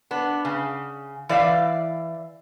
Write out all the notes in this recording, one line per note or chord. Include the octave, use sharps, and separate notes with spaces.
B3 D4
C#3
E3 D5 E5 F5